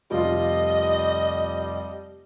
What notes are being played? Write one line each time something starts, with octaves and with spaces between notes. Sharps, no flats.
F1 G3 F4 D#5